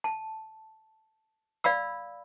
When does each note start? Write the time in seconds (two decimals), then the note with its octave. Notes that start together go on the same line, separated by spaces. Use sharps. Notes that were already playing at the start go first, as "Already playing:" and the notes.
0.04 A5
1.64 D5 F5 B5 E6